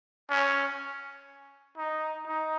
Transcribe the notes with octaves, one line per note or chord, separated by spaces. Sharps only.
C#4
D#4
D#4